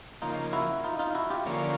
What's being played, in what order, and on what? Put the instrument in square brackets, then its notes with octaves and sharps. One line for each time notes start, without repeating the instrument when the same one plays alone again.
[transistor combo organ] C#3 F3 A#3 [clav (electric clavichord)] D#4 F4
[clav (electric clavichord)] E4 F#4
D#4 F4
D#4 F4
E4 F#4
F4 G4
[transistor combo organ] D3 F3 A#3 C#4